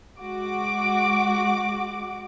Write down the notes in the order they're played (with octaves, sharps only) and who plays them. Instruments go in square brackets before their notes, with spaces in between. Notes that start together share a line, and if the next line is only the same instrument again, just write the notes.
[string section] G#3 F#4 D6